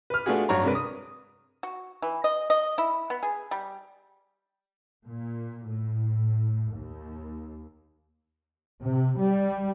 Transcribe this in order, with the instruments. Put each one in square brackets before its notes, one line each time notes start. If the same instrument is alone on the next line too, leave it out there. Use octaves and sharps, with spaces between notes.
[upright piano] B4 F6
A3 B3 D4 F4 F#4 G#4
G2 F#3 C#5 A#5
C3 G3 G#3 D4 A#4 B4
D#6
[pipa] F#4
E3
D#5
D#5
E4
B3
G#4
G3
[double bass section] A#2
A2
D#2
C3
G3